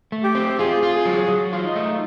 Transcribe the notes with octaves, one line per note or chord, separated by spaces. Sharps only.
A3
G4
C4
F4 G#4
F4
G#4
F#3
F#3
F4
D#4
A3